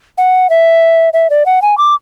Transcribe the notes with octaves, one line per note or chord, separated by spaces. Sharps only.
F#5
E5
E5
D5
F#5
G#5
D6